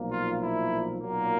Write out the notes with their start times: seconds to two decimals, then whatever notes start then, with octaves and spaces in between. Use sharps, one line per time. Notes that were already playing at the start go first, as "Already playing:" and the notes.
Already playing: B1 A#2 F3 A#3
0.10 F4
0.40 E4
1.00 B1 A#2 F#3 A#3